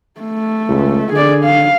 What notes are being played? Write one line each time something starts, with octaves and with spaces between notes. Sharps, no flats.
A3
C#2
D3 G#4 D5
F5